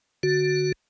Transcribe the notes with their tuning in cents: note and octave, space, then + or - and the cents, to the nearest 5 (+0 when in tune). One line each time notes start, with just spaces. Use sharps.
D3 +10 F#4 +0